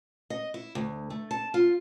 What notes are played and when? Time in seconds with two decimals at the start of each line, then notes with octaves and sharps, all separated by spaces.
0.30 D#5
0.54 E4
0.75 D2
1.10 A3
1.31 A5
1.54 F4